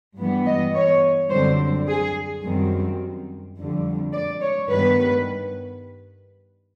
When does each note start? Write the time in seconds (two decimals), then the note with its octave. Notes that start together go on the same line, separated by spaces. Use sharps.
0.17 G2 E3 G3 B3
0.46 D#5
0.74 C#5
1.30 F#2 D3 G3 C4 C5
1.87 G#4
2.43 F#2 D#3 G3 C4
3.56 F2 D3 G3
4.13 D5
4.41 C#5
4.69 G2 D#3 G3 B3 B4